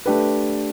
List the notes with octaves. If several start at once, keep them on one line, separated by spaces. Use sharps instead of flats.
A3 D4 G4 B4